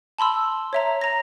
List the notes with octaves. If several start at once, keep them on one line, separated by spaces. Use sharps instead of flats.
A5 B5 C6 E6
C#5 E5 A#5
A#5 A#6